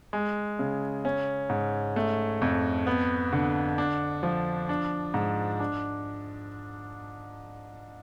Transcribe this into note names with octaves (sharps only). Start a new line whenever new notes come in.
G#3
C#3
C#4
G#2
A3
F2
B3
D3
D4
F3
D4
G#2
D4